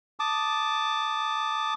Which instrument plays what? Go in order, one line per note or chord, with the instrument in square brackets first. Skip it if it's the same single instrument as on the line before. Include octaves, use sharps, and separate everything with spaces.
[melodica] A5 D6 D#6